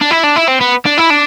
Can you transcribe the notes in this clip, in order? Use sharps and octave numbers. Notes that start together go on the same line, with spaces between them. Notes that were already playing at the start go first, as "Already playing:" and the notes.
D4
E4
D4
E4
C4
B3
D4
E4
D4